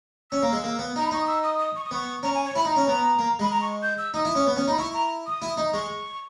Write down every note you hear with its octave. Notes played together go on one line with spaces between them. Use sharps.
C#4 E6
A#3
G#3
A#3
B3
D#4 A#5
B5
D#4 C#6
D#6
E6
D#6
D#6
C#6
D#6
B3 C#6
C#4 A#5
G#5
C#5
E4 B5
D#4
A#5
C#4
B3 A#5
A#3
G#3 B5
A#5
C#6
G6
E6
D#4 D#6
E4
C#4
B3
C#4
D#4
B5
E4 C#6
A#5
D#6
E4
D#4
G#3 C#6